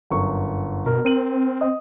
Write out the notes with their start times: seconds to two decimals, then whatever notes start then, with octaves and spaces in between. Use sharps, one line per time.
0.10 G1 F#2 C#6
0.86 B2 A#4
1.05 C4 A#4 D#7 F#7
1.61 D#5 D#6